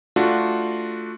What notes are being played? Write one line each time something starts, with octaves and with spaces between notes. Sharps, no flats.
A3 D4 F4 F#4